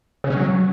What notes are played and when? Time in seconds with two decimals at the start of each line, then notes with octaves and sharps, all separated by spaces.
0.24 C#3
0.30 C#4
0.36 F#3